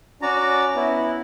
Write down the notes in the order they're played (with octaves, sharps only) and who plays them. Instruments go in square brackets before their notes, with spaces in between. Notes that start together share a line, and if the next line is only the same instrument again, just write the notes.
[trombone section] C#4 [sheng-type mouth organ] F#4 D5 A#5
[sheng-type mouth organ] B3 E4